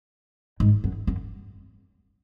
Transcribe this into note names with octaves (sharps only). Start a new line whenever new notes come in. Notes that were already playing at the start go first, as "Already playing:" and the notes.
G#2
F#2
F#2